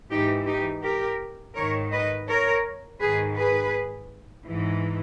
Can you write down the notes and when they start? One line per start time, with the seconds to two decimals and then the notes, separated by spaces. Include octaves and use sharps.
0.10 G#2 E3 D#4 G4
0.46 D#4 G4
0.83 G4 A#4
1.55 G#2 D#3 A#4 C#5
1.91 B4 D#5
2.27 A#4 C#5
3.00 G#2 D#3 G#4 B4
3.37 G#4 B4
4.45 G#2 E3